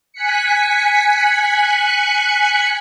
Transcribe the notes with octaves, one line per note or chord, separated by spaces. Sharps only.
G#5 F#6 B6 C#7